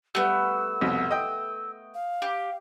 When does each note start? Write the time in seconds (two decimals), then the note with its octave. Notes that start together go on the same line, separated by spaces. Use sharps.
0.15 G3 A3 B3 E6
0.81 C2 F2 B2
1.11 D#5 G5
1.94 F5
2.22 G4